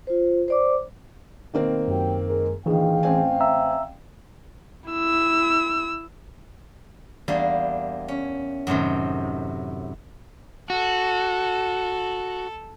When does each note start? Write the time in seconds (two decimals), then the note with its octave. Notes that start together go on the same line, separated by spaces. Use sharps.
0.07 F4 C5
0.48 C5 D5 D6
1.54 B2 D#3 A#3 C4
1.88 F#2 F#3 G4 G5
2.27 G#3 A#4
2.66 A#1 D#3 E3 G#4 F5 G5
3.03 A1 C4 G#5
3.40 E5 A#5 E6
4.90 E4 E6
7.28 E2 G3 A#3 D4
8.08 C#4
8.67 F#2 A2 C3 D#3
10.70 F#4 A4